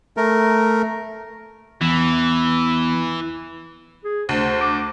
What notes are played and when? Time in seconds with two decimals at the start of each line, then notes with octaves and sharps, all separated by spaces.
0.17 A3 A#4
1.81 E2 E3
4.04 G#4
4.29 D2 C5
4.61 D6